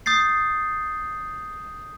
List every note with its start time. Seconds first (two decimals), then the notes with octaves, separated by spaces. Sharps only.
0.06 D#6 G6 A6 C7